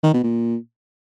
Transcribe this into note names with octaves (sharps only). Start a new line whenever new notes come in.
D#3
B2
A#2